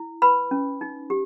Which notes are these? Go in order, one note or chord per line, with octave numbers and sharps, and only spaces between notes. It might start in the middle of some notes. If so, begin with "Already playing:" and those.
Already playing: E4
B4 B5
C#4
D#4
G4